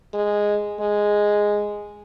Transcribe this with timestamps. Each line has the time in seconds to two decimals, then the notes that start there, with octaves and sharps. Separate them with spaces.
0.14 G#3
0.80 G#3